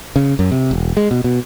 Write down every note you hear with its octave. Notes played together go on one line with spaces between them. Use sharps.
C#3
F#2
C3
E1
G#3
B2
B2